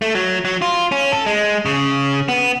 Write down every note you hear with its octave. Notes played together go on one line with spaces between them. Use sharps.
A3
F#3
F#3
F4
C#4
A4
G#3
C#3
B3